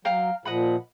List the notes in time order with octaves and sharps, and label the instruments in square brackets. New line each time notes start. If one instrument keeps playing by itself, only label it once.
[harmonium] F#3 [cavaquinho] F5 G5 A#5
[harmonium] A#2 F3 [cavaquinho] D#5 F#5 B5